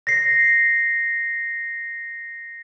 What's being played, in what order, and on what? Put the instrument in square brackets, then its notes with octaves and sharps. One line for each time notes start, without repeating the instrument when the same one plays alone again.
[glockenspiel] A#6 C7